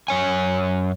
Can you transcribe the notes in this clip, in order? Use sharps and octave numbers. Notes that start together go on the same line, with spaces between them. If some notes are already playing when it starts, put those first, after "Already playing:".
F#2 C#5 G#5